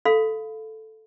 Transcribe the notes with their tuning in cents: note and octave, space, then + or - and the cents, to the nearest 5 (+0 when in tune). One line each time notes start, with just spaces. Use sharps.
A4 +0 F5 +0 B5 +30